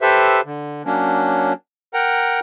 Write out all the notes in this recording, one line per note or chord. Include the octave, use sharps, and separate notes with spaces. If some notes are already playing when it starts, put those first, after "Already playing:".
G4 A4 B4 C5 E5
D3
F#3 A#3 C#4 D4
A#4 F#5 G5 A#5